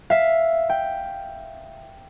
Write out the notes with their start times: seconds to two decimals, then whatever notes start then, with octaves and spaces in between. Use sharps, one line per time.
0.10 E5 F5
0.70 G5